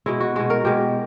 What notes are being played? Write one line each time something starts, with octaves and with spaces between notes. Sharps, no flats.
B2 G#3 E4
F#4
B2 G#3 F#4
A#4
B2 G#3 G4